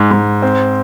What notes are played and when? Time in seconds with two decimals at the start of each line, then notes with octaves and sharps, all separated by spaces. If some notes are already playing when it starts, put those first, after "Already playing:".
Already playing: G#2
0.11 G#2
0.42 C4